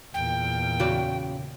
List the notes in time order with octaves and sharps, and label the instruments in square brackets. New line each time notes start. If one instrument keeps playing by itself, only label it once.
[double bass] E2 A#2 [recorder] G5
[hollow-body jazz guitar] C#3 F#4 D5